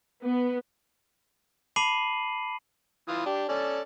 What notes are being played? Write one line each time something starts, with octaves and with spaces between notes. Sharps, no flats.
B3
A5 B5 D6 C7 D#7 F#7
E3 F4 D#6
D4 G4
C#4 A4 D5